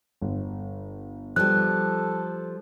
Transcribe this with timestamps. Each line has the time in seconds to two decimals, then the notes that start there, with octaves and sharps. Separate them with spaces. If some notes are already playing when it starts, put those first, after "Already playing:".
0.21 G1
1.36 F3 G3 A4 F#6